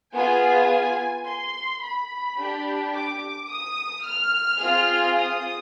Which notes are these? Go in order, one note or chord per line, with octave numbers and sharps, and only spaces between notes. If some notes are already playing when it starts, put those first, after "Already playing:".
B3 F4 G#4 G#5
C6
B5
D4 G4
D6
D#6
F6
C4 F4 G#4
D#6